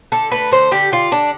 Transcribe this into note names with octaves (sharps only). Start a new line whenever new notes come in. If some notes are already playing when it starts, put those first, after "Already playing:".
D3 A4
A3 B4
D3 C5
D3 G4
D3 F4
D3 D4